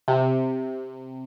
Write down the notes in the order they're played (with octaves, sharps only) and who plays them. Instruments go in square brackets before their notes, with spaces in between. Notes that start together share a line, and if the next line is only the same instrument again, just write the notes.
[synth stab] C3